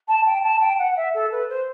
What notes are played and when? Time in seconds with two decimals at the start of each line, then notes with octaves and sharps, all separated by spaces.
0.08 A5
0.26 G5
0.43 A5
0.60 G5
0.78 F#5
0.96 E5
1.14 A4
1.31 B4
1.49 C5